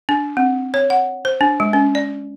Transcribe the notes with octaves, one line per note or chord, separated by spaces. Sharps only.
D4
C4
C#5
F#5
C5
D4
G#3
C#4
D5